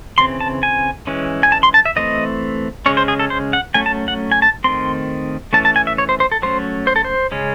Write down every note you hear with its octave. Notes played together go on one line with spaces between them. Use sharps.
C#3 E3 C4 C6
A5
G#5
E3 G#3 C#4
G#5
A5
C6
A5
E5
E3 A3 C4 D#5
C#3 G#3 C#4 C#5
C5
G#4
A4
C5
F#5
F#3 A3 C#4 G#5
A5
F#5
G#5
A5
D#3 A3 C4 C6
E3 A3 C#4 A5
A5
G#5
E5
C#5
C5
C5
A4
F#3 A3 C#4 C5
C5
A4
C5
C#3 G#3 C#4